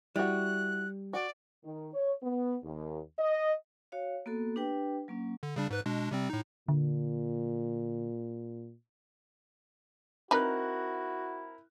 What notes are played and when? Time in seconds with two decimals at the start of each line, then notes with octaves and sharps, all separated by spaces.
0.16 G3 E4 F#4 F#6
1.13 F#4 D5
1.64 D#3
1.93 C#5
2.22 B3
2.64 D#2
3.18 D#5
3.92 F#4 C#5 F5
4.26 A#3 B3 F#4 A4
4.56 D4 G4 B4 G5
5.08 F#3 A#3 C#4
5.43 D3
5.56 C#3 G3 D4
5.70 G#2 B4 F#6
5.86 B2 G#3 D4
6.11 C3 G3 C4
6.30 A2 D#4
6.69 A#2 D3
10.31 C4 D#4 E4 F#4 A#4 B4 F#6